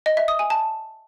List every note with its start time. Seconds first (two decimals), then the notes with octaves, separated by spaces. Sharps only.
0.06 D#5
0.17 E5
0.28 D#6
0.39 G#5
0.50 A5